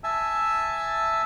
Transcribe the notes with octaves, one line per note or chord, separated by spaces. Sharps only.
E5 G#5 A5 E6